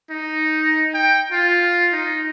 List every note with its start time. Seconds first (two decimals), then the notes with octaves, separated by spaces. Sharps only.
0.10 D#4
0.94 G5
1.32 F4
1.93 D#4